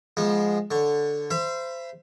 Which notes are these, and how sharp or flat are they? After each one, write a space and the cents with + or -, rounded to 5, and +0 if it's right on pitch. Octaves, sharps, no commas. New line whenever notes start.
F3 +0 G#3 +0 B3 -30
D3 +0 C#5 +0
C5 -15 E5 +40 B5 +0